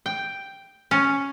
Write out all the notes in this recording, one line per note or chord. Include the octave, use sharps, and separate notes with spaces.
G5
C#4